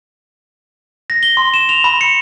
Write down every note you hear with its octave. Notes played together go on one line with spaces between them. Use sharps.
A#6
G7
C6
E7
F7
B5
C#7